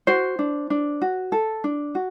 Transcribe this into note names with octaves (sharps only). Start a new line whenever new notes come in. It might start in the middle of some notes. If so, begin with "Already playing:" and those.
F#4 C5
D4
D4
F#4
A4
D4
F#4